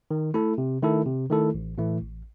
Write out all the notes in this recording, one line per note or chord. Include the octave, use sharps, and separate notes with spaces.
D#3
A3 E4 A4
C3
D#3 A3 E4 A4
C3
D#3 A3 E4 A4
A1
A2 E3 A3 E4
A1